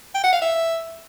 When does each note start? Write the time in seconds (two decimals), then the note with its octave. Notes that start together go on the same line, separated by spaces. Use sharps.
0.14 G5
0.24 F#5
0.33 F5
0.42 E5